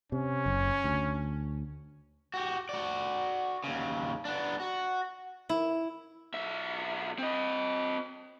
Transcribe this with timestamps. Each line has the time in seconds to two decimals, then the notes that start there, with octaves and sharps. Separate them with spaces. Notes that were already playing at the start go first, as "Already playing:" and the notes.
0.12 C3 C#4
0.46 F#1
0.84 D2
2.34 F#4 G4
2.69 F#4 D5
3.64 D#2 C#3
4.25 B3 D4
4.60 F#4
5.49 E4
6.34 B1 E5
7.19 C4 D#5